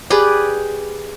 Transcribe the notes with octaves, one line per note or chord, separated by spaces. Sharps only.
G4 G#4 B4 D5